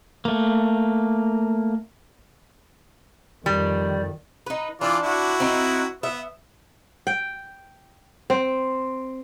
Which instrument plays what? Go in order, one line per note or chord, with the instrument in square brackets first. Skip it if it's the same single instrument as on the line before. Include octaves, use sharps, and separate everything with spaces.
[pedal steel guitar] A3 A#3
[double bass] F2 D#3 [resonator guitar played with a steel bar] G3 [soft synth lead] D5
[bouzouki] D#4 B4
[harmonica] E3 F4 D5 [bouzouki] D4
[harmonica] E4 F#4
[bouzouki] C4 D#4
[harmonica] B3 [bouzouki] E5
[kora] G5
C4